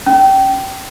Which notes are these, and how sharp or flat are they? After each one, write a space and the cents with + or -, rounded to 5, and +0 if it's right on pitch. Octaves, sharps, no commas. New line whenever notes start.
C#4 -5